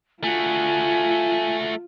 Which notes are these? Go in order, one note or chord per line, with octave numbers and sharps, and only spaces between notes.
A3 F4 F#4 G#5